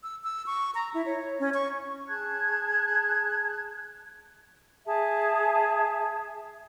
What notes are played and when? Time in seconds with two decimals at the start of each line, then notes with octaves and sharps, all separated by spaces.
0.03 E6
0.24 E6
0.46 C#6
0.75 A#5
0.94 E4
1.06 C#5
1.40 C#4
1.54 C#6
2.09 G#4 A5 F#6 G#6
4.85 G#4 E5 A5